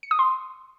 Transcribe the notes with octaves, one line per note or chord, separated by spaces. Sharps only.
C#7
D#6
C6